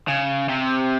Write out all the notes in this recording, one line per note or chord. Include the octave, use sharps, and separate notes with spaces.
C#3
C3